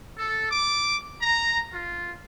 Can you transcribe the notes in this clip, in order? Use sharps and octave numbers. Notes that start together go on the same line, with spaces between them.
A4
D6
A#5
F4